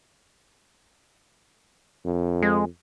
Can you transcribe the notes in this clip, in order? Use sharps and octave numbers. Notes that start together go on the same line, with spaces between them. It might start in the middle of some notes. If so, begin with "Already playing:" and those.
F2
G#3